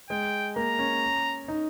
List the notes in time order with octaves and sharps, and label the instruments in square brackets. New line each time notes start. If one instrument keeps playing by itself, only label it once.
[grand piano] G#3 [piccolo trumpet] G5
[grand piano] A#3 [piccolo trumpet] A#5
[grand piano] C#4
D#4